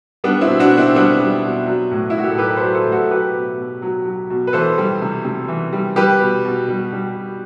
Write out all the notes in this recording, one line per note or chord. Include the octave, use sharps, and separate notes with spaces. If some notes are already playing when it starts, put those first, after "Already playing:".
G3 B3 D4
C4 E4
B2
D4 F#4
B2
C4 E4
G3 B3 D4
G3
B2
F#3
A2
E4
A2 F#4
G4
A4
F#3 G4 B4
B4
A4 C5
F#3
A4 C5
A2
F#4 A4
F#3 G4 B4
B2
B2
F#3
F#3
B2
B4
E3 A4 C5
G3
C3
C3
E3
G3
G3 G4 B4
B2
B2
G3
G3
B2